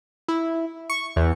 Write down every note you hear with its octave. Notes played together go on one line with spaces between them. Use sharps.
E4
C#6
E2